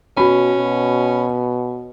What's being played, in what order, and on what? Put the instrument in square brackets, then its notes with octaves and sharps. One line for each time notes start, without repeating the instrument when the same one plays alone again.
[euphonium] B2 [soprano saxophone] C#4 [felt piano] F#4 B5
[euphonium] B2